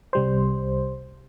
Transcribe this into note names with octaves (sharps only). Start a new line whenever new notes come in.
C2 G3 C5